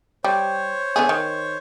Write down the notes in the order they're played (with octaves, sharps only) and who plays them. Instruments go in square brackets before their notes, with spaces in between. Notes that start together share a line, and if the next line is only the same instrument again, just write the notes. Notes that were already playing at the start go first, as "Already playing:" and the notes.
[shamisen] G3 [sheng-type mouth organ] C5 C#5
[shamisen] D3 B3 G#4
D#3